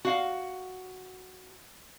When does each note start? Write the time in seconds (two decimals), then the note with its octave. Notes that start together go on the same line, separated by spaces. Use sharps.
0.05 F#4 F5